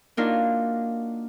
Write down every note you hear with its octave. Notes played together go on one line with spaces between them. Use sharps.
A#3 D4 D#4 F4 F#4 A#4